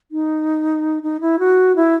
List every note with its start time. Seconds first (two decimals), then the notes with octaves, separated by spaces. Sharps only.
0.12 D#4
1.03 D#4
1.21 E4
1.39 F#4
1.76 E4